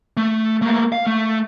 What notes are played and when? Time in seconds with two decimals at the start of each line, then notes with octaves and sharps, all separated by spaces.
0.17 A3
0.62 A3 A#3
0.92 F5
1.06 A3